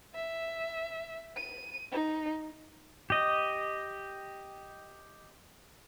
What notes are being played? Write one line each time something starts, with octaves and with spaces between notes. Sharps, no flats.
E5
D#7
D#4
G4 D#5